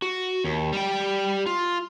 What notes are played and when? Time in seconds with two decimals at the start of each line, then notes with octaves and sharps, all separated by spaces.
0.02 F#4
0.44 D#2
0.73 G3 G5
1.46 F4